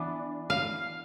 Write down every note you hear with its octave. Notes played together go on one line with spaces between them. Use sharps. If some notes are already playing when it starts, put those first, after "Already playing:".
Already playing: E3 B3 D4
F5